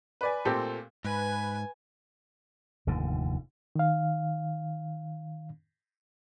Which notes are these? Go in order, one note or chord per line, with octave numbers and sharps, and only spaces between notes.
B4 D5 G#5
A#2 A3 C4 G4 A4
G#2 B4 G#5
F1 D#2 G#2 D3
D#3 F5